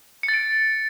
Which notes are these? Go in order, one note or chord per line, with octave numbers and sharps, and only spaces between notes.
C#7
A6
D7